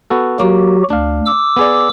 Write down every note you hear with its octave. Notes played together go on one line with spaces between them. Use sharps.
B3 F#4 A4
F#3 A#3 F#4 G4
D2 D4 F5
D6 E6
B3 G#4 D5